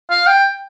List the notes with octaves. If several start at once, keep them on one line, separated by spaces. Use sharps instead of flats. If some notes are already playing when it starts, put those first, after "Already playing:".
F5
G5